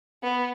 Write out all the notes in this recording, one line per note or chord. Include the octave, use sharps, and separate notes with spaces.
B3